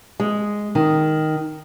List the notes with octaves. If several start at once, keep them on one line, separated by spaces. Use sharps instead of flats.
G#3
D#3